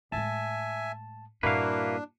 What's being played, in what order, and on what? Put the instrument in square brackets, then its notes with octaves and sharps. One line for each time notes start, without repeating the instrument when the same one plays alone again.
[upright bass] A2 G#3 [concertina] E5 G#5 [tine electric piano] A5
[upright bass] G2 A#2 [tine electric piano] A#3 E4 F#4 [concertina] D4 [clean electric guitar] B4 F5